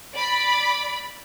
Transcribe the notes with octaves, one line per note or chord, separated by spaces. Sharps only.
D5 B5